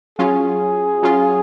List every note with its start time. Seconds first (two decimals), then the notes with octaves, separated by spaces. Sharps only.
0.19 F#3 C#4 F4 G#4
1.03 F#3 C#4 F4